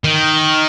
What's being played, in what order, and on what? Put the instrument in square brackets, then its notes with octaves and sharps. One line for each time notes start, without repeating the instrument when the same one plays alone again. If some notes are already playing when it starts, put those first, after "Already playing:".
[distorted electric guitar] D#3